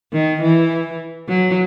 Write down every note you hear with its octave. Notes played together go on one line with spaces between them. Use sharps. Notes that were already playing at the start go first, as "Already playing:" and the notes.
D#3
E3
F#3